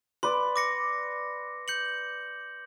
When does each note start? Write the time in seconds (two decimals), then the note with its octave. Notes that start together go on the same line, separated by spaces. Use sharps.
0.23 B4 D5 C6
0.56 D6 A#6 C#7
1.68 G6 C#7 F#7